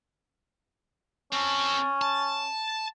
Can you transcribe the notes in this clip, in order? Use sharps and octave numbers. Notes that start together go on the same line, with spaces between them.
C4 C#4 A4
A5